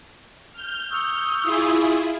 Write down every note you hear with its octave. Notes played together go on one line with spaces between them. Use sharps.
F6 G6
C#6 D#6 E6
E4 F4 G#4